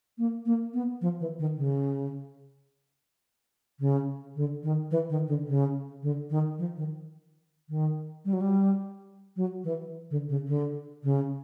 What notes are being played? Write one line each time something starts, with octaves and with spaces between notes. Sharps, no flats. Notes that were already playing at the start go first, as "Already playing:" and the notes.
A#3
A#3
B3
F3
E3
D#3
C#3
C#3
D3
D#3
E3
D#3
D3
C#3
D3
D#3
F3
D#3
D#3
G3
F#3
G3
F#3
E3
D3
C#3
D3
C#3